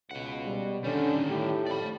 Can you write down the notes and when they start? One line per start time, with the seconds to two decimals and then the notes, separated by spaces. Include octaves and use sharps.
0.11 C#2 B2 F#5
0.45 G3
0.84 D3 D#3 G3 C#4
1.30 A2 G4
1.67 F2 D5 B5